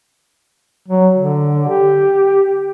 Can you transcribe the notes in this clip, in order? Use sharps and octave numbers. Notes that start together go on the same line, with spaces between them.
F#3
D3
G4